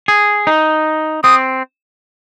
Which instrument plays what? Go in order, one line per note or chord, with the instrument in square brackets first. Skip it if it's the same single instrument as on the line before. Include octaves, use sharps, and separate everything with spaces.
[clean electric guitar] G#4
D#4
[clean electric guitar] C4 [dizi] D#6